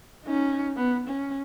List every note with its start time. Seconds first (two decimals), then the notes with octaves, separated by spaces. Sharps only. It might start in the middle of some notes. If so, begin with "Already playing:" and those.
0.25 C#4 D#4
0.76 B3
1.08 C#4